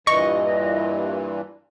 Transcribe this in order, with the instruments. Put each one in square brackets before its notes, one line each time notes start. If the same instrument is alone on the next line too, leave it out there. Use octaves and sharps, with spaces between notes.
[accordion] G2 A#2 E3 [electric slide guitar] D#5 [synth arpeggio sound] C#6